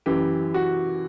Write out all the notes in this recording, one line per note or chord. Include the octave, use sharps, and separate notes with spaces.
F#2 E3 G4
F#4